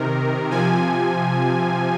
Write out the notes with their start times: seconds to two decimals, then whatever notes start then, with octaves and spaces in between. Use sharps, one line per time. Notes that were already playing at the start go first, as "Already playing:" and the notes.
Already playing: C3 D#3 A#4
0.51 C3 F3 G#5